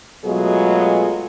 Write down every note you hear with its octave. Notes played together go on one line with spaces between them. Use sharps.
B2 F#3 G#3 A3 F4 G#4